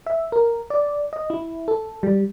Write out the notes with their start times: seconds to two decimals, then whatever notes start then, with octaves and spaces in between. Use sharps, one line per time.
0.07 E5
0.32 A#4
0.70 D5
1.13 D#5
1.30 E4
1.68 A4
2.03 G3